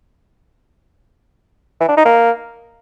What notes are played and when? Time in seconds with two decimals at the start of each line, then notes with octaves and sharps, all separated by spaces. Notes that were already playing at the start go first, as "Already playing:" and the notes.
1.80 E3
1.89 D4
1.97 D#4
2.05 A#3